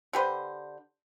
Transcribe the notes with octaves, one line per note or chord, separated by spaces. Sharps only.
D3 G4 B4 C5